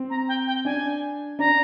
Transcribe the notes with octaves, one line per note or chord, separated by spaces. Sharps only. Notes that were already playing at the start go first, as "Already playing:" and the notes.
Already playing: C4
A#5
G5
G5
D4 G#5
D4 A#5